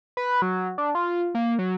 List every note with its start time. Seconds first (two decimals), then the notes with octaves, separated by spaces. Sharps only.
0.17 B4
0.42 F#3
0.78 D4
0.95 F4
1.35 A#3
1.59 F#3